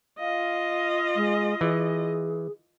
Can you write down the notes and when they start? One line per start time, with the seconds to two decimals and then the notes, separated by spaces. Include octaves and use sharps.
0.19 F4 D#5 F5
1.16 G#3
1.61 E3 G#4